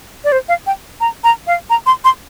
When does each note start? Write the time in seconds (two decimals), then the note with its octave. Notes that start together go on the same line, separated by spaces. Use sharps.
0.24 D5
0.32 C5
0.49 F5
0.67 G5
1.01 A#5
1.24 A#5
1.47 F5
1.70 A#5
1.86 C6
2.05 C6